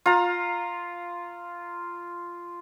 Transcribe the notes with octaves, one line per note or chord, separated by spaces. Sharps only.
F4 A#5